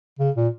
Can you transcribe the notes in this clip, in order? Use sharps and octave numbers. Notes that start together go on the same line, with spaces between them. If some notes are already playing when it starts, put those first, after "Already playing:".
C#3
A#2